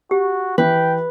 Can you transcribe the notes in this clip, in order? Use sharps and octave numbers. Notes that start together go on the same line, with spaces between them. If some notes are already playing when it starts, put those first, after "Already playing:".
F#4 G4
E3 B4 G5